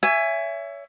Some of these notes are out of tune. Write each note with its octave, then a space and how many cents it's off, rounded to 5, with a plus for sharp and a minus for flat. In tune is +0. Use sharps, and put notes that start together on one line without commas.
C#5 +30 E5 +15 G#5 -5